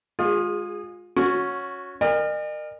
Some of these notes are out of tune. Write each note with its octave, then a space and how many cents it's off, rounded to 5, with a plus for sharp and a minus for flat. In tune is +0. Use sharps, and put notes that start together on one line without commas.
G#3 +0 F4 +30 G#4 -20
C#4 +0 F#4 -20
A#4 +0 D#5 -45 G#5 -45